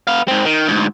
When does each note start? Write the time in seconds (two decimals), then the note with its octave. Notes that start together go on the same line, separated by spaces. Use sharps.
0.07 B3 F5
0.28 G#2 C4
0.45 D#3
0.67 D2 G#2